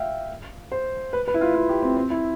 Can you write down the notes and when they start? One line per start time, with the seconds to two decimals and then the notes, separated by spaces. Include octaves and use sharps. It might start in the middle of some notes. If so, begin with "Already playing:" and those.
Already playing: E5 F5 G5
0.72 C5
1.13 B4
1.28 B4
1.34 E4
1.41 F4
1.54 F4
1.69 G4
1.82 C4
1.97 C4
2.10 E4